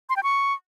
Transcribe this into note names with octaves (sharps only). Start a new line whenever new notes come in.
C6
G5
C#6